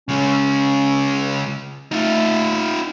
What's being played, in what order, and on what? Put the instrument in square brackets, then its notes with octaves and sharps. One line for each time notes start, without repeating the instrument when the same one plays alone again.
[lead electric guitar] C#3 G#3 [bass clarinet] C#4
[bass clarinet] A3 [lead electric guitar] D#4 F4